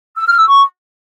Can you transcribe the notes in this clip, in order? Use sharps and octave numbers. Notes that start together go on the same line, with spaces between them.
E6
F6
E6
C#6